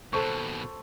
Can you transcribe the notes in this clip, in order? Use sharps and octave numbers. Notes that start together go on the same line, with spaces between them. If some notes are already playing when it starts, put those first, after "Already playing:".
D#2 B2 A4 C5 C#6